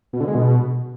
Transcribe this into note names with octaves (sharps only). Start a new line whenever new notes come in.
B2
D3
G#3
B2